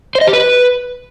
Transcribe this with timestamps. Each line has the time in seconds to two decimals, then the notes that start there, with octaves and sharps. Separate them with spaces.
0.15 C5
0.21 D#5
0.27 G4
0.33 B4